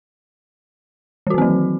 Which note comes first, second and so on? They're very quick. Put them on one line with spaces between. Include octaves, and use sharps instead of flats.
E3 F#4 D#3 C4 F#3